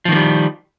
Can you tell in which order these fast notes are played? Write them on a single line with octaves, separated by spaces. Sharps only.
F3 D#3 A#3 G3